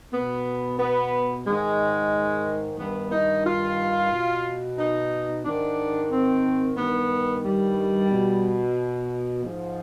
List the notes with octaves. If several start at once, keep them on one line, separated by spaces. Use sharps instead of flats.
B2 B3
B3
G#2 D#3 G#3
G2 D#3 B3
D#4
F4
B2
D#4
G#2 D#3 D4
C4
G2 D#3 B3
G3
B2
G#2 F3